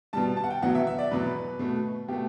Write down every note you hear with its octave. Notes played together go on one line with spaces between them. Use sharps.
B2 G3 A5
A5
F#5
G5
E2 B2 F#3 F#5
E5
E5
D5
E2 B2 F#3 B4
B2 A3
B2 A3 G4